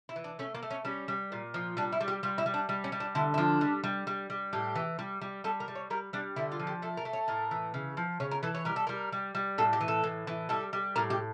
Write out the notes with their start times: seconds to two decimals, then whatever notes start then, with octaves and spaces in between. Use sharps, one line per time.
0.09 E4
0.16 E3
0.24 D4
0.39 A3 C#4
0.54 A#3
0.63 A3
0.70 C#4
0.85 G3 C#4
1.08 G3
1.32 A#2
1.54 F3
1.77 G3 D4
1.92 E4
2.01 G3
2.08 G4
2.23 G3 F4
2.38 E4
2.46 G3
2.54 D4
2.69 G3
2.84 C#4
2.92 G3
3.00 D4
3.15 D3 E4
3.34 E4
3.38 F3 D4
3.61 G3
3.84 G3
4.07 G3
4.30 G3
4.53 A2 G4
4.75 E3
4.99 G3
5.21 G3
5.44 G3 A4
5.60 A#4
5.68 G3
5.75 C#5
5.90 G3 A#4
6.13 G3 D4
6.36 D3 E4
6.52 F4
6.59 F3
6.67 G4
6.82 A3 A4
6.97 A#4
7.05 A3
7.13 C#5
7.28 A2 A#4
7.51 E3
7.74 C#3
7.97 F3
8.20 C#3 C#5
8.31 A#4
8.43 E3 A4
8.55 C#5
8.65 G3 A#4
8.76 A4
8.87 G3 A#4
9.12 G3
9.35 G3
9.58 A2 A4
9.73 G4
9.81 E3
9.88 A4
10.04 A2
10.27 E3
10.49 G3 A4
10.73 G3
10.96 A2 A#4
11.10 G4